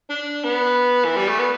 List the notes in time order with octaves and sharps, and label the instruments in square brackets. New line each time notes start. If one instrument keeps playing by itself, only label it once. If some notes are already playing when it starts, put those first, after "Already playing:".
[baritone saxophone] D4
B3
E3
G3
A3
B3